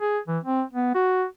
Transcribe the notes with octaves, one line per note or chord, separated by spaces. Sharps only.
G#4
E3
C4
B3
F#4